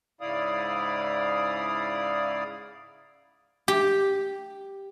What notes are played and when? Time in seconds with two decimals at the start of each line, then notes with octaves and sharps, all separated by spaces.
0.21 G#2 C#3 E4 D5 F5 D#6
3.68 G4